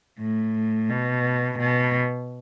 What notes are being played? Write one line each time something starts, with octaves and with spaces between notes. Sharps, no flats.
A2
B2
B2